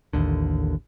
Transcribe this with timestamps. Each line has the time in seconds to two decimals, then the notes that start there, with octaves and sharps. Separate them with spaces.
0.13 A1 D#2 D3